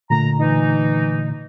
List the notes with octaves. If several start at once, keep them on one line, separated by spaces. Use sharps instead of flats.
A#2 D3 A3 A#5
E3 D#4